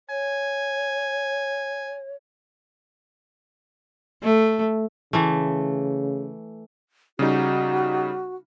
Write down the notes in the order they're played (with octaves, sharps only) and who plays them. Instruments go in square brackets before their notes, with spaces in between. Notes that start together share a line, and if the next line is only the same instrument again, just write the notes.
[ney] C#5 [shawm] G#5
[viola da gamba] A3
[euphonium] C#3 [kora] E3 A3
[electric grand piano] C#3 G3 D#4 [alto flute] F#4